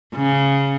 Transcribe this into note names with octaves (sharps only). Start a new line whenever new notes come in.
C#3